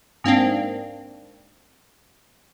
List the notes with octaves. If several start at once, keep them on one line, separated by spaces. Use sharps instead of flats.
G#2 A#3 C4 D4